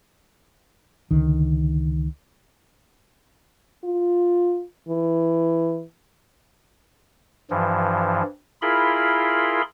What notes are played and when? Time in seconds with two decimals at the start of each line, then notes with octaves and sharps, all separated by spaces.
1.11 C#2 D3 D#3
3.84 F4
4.89 E3
7.50 G2 E3 F3
8.62 E4 F4 G#4 A#4 B5 C6